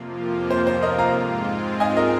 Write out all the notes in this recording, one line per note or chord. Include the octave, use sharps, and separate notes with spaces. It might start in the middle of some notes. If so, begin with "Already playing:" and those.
Already playing: F2 C3 F3 A#3 F4
C5
C5
A#4 D#5
F5 A#5
G#2 G#3 C4 F4
D#5 G#5
A#4 D#5